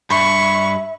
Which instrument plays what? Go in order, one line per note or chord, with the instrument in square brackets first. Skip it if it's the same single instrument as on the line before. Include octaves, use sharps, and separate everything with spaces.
[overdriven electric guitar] G2 [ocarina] E5 [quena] B5 [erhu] C#6